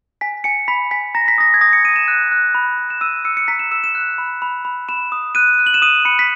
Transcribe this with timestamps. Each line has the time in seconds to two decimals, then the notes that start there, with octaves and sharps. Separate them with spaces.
0.21 G#5 B6
0.44 G#5 C#7
0.68 B5 B6
0.91 G#5 B6
1.15 A#5 A#6
1.28 B6
1.38 D#6 A#6
1.54 G#6
1.61 D#6 A#6
1.73 C#7
1.85 D#6 D#7
1.96 E7
2.08 F#6
2.32 F#6
2.55 B5
2.78 B5
2.90 E7
3.01 E6 D#7
3.25 E6 C#7
3.37 C#7
3.48 A#5 B6
3.59 E7
3.71 E6 E7
3.84 E7
3.95 F#6
4.18 B5
4.42 B5
4.65 B5
4.89 B5 E7
5.12 D#6
5.35 F#6 D#7
5.59 F#6
5.67 F#7
5.74 E7
5.82 D#6 D#7
6.05 B5 C#7
6.19 B6